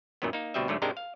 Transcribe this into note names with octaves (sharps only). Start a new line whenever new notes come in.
F#2 A#2 D#3 F#3 B3
A#3 D#4
D2 B2 G3 C4 D#5 E5
G#2 D3 F#3 A3
G#2 C3 G#3 D4 A#4 G5
F5